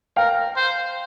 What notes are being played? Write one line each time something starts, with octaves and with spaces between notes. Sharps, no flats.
A#4 F5 G5
C5